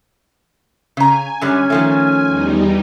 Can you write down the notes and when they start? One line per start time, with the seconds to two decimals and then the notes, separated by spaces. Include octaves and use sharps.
0.97 C#3 G#5 A#5
1.41 F#2 D3 G3 C#4
1.70 D#3 F3 A3
2.29 E2 G3 D#4